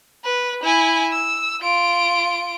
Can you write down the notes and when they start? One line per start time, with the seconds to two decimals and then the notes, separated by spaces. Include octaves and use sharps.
0.24 B4
0.63 E4 G#5
1.12 E6
1.61 F4 D7